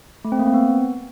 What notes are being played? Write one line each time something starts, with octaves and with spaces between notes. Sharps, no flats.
A3
C4
A#3
C4
B3